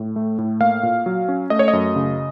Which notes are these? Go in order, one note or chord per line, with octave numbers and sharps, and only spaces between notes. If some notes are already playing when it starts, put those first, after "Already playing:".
Already playing: A2
A3
A2
A#3 F5
A#2
F#3
C#4
A3 D#5
C#5
D#5
F#2
C#3